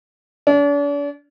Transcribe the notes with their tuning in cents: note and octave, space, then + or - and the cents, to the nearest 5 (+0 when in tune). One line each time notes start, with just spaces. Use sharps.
D4 -40